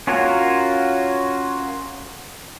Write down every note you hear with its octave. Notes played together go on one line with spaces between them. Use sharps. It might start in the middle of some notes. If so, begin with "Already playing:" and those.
C#4 F4 F#4 A#4 C#5